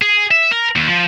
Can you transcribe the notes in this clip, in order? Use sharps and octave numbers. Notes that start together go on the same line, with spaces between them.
G#4
E5
A#4
D#2
F3